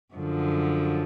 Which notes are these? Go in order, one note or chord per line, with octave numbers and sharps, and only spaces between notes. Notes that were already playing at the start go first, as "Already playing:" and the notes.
F#2 D3 F3